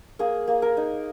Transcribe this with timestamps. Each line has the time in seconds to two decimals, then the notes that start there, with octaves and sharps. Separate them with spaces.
0.19 A#3 G#4
0.48 A#3
0.62 A#4
0.77 D#4